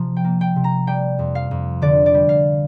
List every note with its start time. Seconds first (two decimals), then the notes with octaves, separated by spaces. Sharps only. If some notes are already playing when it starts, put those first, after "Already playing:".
Already playing: C3 F3 A#5
0.16 G5
0.24 A#3
0.41 G5
0.56 C3
0.64 A#5
0.87 G3 G5
1.19 F2
1.35 F5
1.51 F2
1.82 D3 D5
2.06 D5
2.14 G3
2.29 F5